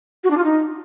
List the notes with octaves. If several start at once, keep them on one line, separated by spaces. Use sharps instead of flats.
F#4
D4
F4
D#4